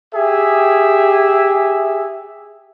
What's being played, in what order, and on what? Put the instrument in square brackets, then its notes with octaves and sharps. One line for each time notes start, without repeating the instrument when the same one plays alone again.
[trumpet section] G4 G#4 E5